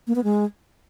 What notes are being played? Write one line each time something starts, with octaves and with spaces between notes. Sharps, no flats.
A#3
B3
G#3